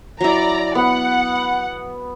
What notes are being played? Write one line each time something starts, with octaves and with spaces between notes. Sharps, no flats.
F#3 E4 D5 A#5
B3 F#5